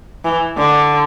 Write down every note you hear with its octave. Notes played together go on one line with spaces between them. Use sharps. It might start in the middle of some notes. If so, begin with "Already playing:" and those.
E3
D3